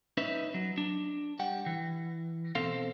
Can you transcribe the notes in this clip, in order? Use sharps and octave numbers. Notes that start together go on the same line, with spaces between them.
C#4 D#4 B4 E5
F#3
D4
G3 F#5 G5
E3
B2 C4 A4 C5 F5